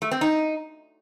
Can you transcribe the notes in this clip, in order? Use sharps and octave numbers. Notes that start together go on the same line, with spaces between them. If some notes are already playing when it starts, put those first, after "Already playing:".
A3
C4
D#4